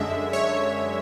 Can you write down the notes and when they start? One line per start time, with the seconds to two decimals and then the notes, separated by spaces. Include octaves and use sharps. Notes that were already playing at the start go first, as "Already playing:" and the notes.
Already playing: F#2 D3 G#3 E5
0.33 C#5